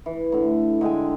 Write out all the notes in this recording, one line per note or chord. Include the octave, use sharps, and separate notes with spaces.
E3
A2 D3
D3 G#3 G5 G#5